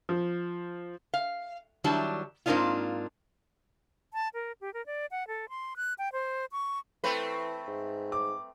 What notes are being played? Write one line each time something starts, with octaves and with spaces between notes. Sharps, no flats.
F3
F5
D#3 F#3 G3 D4 E4 A5
G#2 A#3 C4 D4 D#4 F4
A5
A#4
G4
A#4
D5
F#5
A4
C6
F#6
G5
C5
C#6
E3 A3 C4 B4
G#2
D6